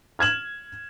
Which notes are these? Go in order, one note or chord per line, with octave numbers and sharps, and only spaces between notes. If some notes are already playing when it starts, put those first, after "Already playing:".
F6 G#6 E7 F#7